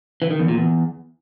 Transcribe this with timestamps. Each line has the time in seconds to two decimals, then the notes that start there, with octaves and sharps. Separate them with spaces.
0.22 E3
0.31 D#3
0.39 E2
0.48 A#2
0.57 E2